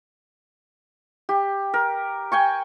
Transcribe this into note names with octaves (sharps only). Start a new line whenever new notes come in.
G4
A#4
G5 G#5 C#6